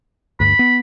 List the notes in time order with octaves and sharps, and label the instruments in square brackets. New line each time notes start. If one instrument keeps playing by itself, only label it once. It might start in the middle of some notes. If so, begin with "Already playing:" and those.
[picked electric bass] D2 G2 [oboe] B5
[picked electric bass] B3